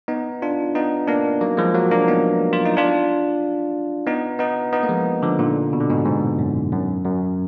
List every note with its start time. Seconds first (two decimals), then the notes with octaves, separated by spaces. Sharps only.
0.08 B3 D#4
0.42 D4 F4
0.75 B3 D#4
1.08 A#3 D4
1.41 F#3 A#3
1.57 F3 G#3
1.74 F#3 A#3
1.91 A#3 D4
2.08 B3 D#4
2.53 F4
2.66 D#4
2.77 D4 F4
4.07 B3 D#4
4.39 B3 D#4
4.73 B3 D#4
4.83 A#3
4.89 F3 G#3
5.22 D3 F3
5.39 A#2 D3
5.73 B2
5.80 D3
5.90 G#2 B2
6.05 G#2
6.39 F#2
6.72 F#2
7.04 F#2